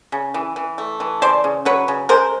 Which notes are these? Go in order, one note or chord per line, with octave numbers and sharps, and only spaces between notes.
C#3
E3
E3
A3
E3
C#3 C5 D5
C#3
F#3 B4 C#5
C#3
G#3 A#4 C5